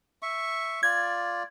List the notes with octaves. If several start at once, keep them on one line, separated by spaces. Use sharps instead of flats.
E5 C#6
F4 D5 G#6